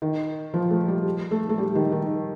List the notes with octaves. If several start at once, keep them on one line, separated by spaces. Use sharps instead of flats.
D#3
F3
A3
G3
A3
A3
G3
D#3
D#3